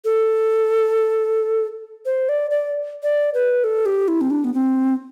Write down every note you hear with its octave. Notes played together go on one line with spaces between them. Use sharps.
A4
C5
D5
D5
D5
B4
A4
G4
E4
C4
D4
B3
C4